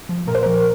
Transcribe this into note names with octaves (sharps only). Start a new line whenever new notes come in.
F3
A#2 A#4
C5
F3 A#4